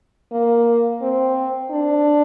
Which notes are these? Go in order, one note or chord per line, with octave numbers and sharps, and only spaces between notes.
A#3
C4
D4